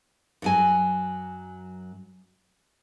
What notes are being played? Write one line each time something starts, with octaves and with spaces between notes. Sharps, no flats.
F#2 F#3 G#5